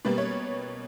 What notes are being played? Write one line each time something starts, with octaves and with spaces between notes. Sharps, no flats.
B2 G3 A#3 B4
C#5